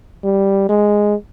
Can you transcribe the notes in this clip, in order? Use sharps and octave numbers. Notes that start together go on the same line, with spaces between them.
G3
G#3